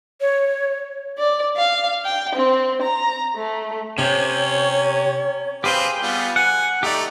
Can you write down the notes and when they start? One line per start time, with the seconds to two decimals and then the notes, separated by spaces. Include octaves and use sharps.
0.21 C#5
1.18 D5
1.57 F5
2.05 G5
2.35 C4
2.82 A#5
3.36 A3
3.98 C3 C#4 C#5
5.64 C4 G4 G#4 B4 F5 G5
6.02 G3 B3 F4
6.36 F#5 G#5
6.83 A3 D#4 G4 D5